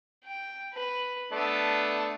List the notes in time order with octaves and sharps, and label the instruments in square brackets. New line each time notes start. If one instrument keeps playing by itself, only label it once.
[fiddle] G5
B4
[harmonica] A3 B3 D4 [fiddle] A5